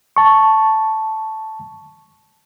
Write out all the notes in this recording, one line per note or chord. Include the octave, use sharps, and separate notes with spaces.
A5 C#6